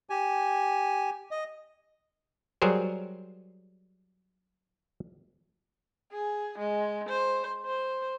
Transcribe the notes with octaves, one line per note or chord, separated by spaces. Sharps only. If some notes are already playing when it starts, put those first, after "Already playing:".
G4 G#5
D#5
F#3 G3 G#4 A#4 C5
G#4
G#3
C5
C5